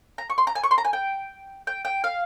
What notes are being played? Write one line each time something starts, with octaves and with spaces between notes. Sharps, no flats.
A#5
C#6
C6
A#5
G#5
C#6
C6
A#5
G#5
G5
G5
G5
F5